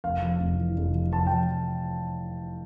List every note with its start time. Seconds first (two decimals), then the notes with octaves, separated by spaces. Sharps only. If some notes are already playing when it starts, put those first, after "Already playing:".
0.04 F1 F5
0.22 F2
0.40 F1
0.58 E3
0.77 F1
0.95 F2
1.13 F1 A5
1.27 F2 G5